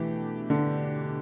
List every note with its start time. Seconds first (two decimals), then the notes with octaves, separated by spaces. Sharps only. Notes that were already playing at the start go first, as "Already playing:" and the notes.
Already playing: B2 E3 A3 D4 G4
0.50 D3